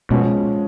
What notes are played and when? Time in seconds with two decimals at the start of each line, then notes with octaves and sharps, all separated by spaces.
0.11 B2 F3 G#3 C#4